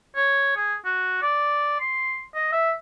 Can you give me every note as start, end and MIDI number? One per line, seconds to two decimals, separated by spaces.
0.16 0.53 73
0.57 0.74 68
0.85 1.18 66
1.22 1.76 74
1.80 2.24 84
2.35 2.50 75
2.53 2.72 76